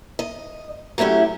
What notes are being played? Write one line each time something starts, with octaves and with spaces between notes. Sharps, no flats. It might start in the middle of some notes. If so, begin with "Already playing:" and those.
D#5
F#3 A3 C#4 E4 G4